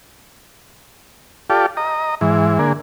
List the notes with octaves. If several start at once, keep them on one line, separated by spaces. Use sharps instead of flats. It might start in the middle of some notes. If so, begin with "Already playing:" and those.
F4 G4 A4 D5
D#5 A#5
G#2 E3
D3 A#3 G#4